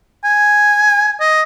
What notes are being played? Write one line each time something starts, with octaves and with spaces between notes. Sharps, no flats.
G#5
D#5